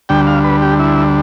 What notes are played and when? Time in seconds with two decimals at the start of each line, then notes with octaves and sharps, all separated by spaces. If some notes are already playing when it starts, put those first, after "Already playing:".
0.09 D2 D3 G3 G5
0.27 F5
0.44 B4
0.62 G4
0.79 E4